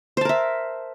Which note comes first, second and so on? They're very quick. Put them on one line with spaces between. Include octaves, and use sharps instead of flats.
C5 A5 A#4 E5